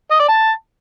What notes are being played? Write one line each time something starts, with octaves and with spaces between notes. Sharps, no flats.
D#5
D5
A5